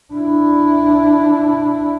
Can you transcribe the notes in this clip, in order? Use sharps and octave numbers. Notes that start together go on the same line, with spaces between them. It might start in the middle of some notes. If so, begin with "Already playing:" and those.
D4 E4